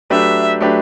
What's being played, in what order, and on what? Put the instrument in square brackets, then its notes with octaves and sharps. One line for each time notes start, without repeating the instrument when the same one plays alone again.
[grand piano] F#3 A3 D4 G4 B4 [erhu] E5
[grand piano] F#3 A3 D4 G4 B4